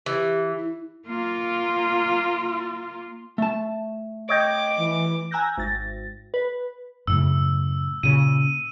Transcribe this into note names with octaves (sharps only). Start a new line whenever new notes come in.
E3 G4
E4
A#3 F4
A3 A5
C#5 D#5 G5 D6
E3
G#5 A#5 E6 F#6 G6 A#6
G#1 A6 A#6
B4
F#2 A2 C#3 E6
A#2 C#3 D#7